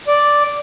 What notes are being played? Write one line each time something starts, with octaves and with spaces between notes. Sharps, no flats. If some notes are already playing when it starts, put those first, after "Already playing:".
D5